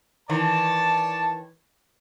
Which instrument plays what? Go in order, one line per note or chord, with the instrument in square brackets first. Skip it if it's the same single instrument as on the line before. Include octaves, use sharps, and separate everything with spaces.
[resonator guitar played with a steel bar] D#3 E3 [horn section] C#5 D5 A5